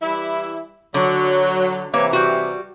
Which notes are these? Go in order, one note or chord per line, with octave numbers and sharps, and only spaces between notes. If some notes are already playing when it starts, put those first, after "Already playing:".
E3 G3 E4
D3 F#3
C3 E3 A#3 C#5
G3 F#4